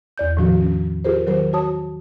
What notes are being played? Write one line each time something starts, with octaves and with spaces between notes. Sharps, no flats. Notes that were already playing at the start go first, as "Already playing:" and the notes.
E2 D5 G6
A2 D#3 F3 D4 F#4
C#4
F4 G4 G#4 A#4 C5
D#3 F#3 A#4 C5
F#4 C#5 A5 D#6